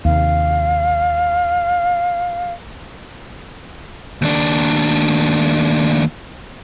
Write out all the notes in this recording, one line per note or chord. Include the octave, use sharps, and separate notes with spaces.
D#2 C3 F5
D#2 D4